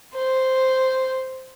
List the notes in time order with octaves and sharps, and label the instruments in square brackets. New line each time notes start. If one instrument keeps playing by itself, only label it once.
[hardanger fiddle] C5